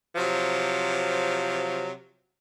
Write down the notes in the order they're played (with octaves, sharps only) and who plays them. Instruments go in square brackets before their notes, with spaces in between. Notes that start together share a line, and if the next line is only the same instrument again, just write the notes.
[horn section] C3 F3 F#3